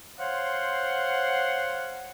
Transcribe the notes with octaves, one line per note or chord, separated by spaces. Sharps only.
C5 C#5 F5 F#5 C6